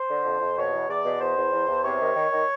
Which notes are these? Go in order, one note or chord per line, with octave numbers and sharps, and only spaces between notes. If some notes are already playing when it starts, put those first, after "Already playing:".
Already playing: C5
D3
F2
F2
B2 C#5
E2
E2 D5
B2
E2 C5
E2
E2
E2
C3 C#5
D#3
D#3
D#3